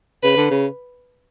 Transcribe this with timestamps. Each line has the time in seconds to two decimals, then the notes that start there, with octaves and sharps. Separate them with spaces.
0.23 C#3 B4
0.37 D3
0.50 C#3